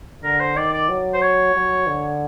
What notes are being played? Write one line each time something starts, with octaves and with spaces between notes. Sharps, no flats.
D3 A#4
C5
D#3 D5
D5
F#3
C5
C#5
F#3
D3